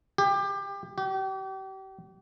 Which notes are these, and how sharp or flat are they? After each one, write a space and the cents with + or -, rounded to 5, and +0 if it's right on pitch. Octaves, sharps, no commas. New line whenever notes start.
G4 +25
G4 -35